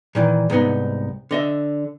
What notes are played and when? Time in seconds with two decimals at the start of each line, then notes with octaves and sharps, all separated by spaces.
0.15 A#2 D#3 E3
0.50 C2 G#2 B3 D#4
1.31 D3 D#5 E5